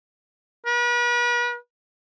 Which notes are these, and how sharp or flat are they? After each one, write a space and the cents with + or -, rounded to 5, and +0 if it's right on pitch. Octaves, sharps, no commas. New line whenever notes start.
B4 -40